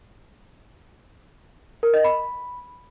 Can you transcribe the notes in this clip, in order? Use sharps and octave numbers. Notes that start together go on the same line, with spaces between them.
A#4
D#5
B5